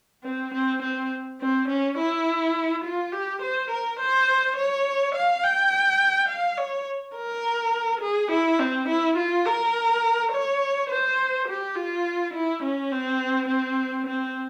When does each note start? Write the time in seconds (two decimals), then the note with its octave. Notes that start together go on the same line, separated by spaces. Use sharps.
0.24 C4
0.54 C4
0.83 C4
1.41 C4
1.68 C#4
1.98 E4
2.84 F4
3.12 G4
3.42 C5
3.70 A#4
4.00 C5
4.57 C#5
5.15 F5
5.44 G5
6.29 F5
6.57 C#5
7.16 A#4
8.01 G#4
8.31 E4
8.59 C4
8.89 E4
9.17 F4
9.46 A#4
10.32 C#5
10.90 C5
11.48 G4
11.76 F4
12.34 E4
12.63 C#4
12.91 C4
13.49 C4
14.06 C4